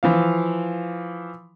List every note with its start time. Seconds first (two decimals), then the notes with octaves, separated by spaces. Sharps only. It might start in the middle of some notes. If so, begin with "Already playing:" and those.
0.03 E3 F3 F5